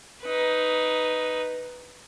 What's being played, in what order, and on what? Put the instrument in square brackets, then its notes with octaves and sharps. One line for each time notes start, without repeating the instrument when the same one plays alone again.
[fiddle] D#4 B4